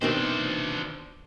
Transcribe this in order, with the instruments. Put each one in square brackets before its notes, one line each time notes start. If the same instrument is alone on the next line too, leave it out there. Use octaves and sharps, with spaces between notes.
[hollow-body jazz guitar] B2 D#3 C4 [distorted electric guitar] D4 C5